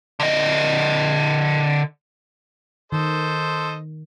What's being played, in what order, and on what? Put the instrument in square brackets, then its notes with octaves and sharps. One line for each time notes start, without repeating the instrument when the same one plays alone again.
[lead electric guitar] D3 D#5
[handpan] D#3 [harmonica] A4 C5 D#5